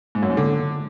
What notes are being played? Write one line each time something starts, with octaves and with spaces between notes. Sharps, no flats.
G#2
F#2
G#2
D3